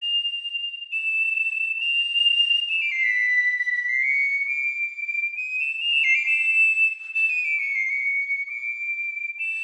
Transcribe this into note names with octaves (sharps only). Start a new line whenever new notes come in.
F7
E7
F7
E7
D7
C7
B6
B6
B6
C7
C#7
D7
D#7
E7
F7
E7
C7
D7
E7
E7
D#7
D7
C#7
C7
C#7
D7
E7